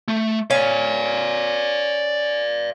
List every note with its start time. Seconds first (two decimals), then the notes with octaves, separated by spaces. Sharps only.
0.08 A3
0.51 C#4 D5 F5